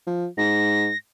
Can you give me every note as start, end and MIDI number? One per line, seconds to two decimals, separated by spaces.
0.07 0.27 53
0.38 0.90 44
0.38 0.97 94